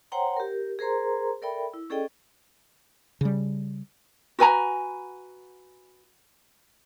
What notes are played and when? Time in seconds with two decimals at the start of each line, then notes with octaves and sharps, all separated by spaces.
0.12 C5 C#5 F#5 G5 A#5 C6
0.37 G4 A#4
0.79 G#4 A#4 C5 A#5 C6
1.42 A4 A#4 D5 E5 G5 B5
1.74 E4
1.90 C#4 G#4 A4 D5 D#5 G5
3.21 C#3 G3
4.39 F#4 B4 G#5 A#5